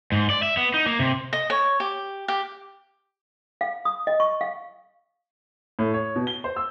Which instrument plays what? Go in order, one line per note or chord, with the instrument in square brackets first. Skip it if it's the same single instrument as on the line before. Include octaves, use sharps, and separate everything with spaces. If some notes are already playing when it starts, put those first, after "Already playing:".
[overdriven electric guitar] G#2
D5
E5
B3
D#4
A#3
C3
[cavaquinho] D#5
C#5
G4
G4
[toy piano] F5
D#6
D#5
C#6
F5
[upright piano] A2
C#5
B2
G7
C5
E6